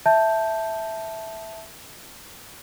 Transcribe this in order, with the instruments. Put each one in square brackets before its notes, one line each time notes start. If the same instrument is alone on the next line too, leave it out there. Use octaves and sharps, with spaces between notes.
[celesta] E5 A5 G6